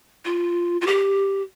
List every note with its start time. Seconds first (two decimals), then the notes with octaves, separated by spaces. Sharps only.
0.25 F4
0.81 F4
0.87 G4